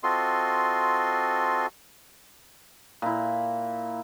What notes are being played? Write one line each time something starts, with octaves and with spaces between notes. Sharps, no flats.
C4 F4 F#4 A4 D#5 C6
A#2 E4